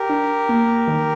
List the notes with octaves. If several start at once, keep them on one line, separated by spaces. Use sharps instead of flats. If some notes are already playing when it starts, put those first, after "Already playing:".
Already playing: G4 A#4
D4
A#3
D#3